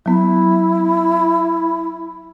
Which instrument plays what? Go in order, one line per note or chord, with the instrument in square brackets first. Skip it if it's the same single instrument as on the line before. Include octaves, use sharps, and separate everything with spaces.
[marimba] F#3 B3 [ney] E4